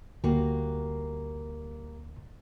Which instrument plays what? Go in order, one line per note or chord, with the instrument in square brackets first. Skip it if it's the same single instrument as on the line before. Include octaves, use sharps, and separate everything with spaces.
[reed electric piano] D2 [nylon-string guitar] G3 A#3 F#4